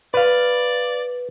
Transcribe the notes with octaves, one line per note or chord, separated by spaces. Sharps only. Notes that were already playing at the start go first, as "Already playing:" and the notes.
B4 D5 F5